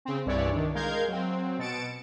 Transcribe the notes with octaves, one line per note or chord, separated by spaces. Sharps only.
C#3 C4
C2 G2 E3 E4 C#5 D5
D#3 D4
G#3 A#4 F5 G6 G#6
F#3 C4
B2 A6 C#7 D7 E7